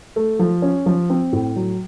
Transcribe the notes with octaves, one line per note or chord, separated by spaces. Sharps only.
A3
F3
C#4
F3
C4
A2
F#3